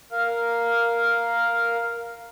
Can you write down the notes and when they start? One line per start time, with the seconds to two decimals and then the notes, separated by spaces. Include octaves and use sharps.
0.12 A#4 F5